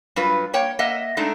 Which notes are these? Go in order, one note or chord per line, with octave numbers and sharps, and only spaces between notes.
G2 F#3 F4 B4
A#3 C#5 G5
A#3 D#5 E5 F#5
G#3 A3 D4 D#4